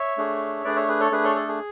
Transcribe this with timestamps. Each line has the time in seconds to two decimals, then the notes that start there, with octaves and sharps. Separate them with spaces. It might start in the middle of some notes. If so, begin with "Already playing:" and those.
Already playing: C#5 E5
0.17 A3 D4 G#4
0.64 A3 D4 G#4 B4 D5
0.76 C#5 E5
0.88 G#4 B4
1.00 A4 C#5
1.12 A3 D4 G#4 B4
1.24 A4 C#5
1.36 A4
1.48 G#4